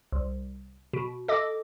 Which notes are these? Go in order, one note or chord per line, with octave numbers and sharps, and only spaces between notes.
C2
B2
A4 D#5 D6